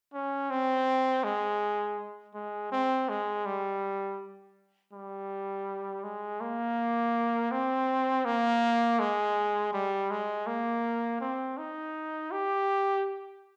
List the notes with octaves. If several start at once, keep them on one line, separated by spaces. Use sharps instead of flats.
C#4
C4
G#3
G#3
C4
G#3
G3
G3
G#3
A#3
C4
A#3
G#3
G3
G#3
A#3
C4
D#4
G4